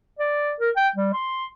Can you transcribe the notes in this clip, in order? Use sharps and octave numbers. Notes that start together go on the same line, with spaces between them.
D5
A#4
G5
G3
C6